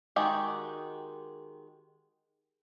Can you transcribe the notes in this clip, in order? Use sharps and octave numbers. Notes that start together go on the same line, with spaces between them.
D#3 G#3 F#4 G4